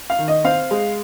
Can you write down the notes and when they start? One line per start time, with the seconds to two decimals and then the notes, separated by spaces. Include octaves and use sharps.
0.10 F5
0.19 D#3
0.28 D#5
0.44 C4 F5
0.71 G#3